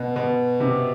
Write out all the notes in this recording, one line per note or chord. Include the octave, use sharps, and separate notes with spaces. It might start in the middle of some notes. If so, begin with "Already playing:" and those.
Already playing: B2
B2
C3